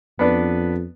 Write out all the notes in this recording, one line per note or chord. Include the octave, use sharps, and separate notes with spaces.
F2 B3 D4 B4